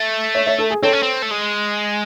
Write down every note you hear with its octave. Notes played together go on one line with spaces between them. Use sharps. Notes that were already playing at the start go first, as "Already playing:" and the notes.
Already playing: A3
C#5 E5
C#5 E5
A4
G#4
C4 A4 C#5
C#4
C4
A3
G#3